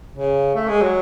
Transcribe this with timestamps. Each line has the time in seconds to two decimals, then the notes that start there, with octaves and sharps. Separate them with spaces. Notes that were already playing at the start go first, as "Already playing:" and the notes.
0.16 C#3
0.55 A3
0.68 G#3
0.81 F#3